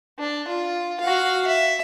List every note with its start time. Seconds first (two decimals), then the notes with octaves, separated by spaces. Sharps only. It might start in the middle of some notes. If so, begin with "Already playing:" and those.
0.19 D4
0.48 F4
1.01 F#4 F5
1.47 E5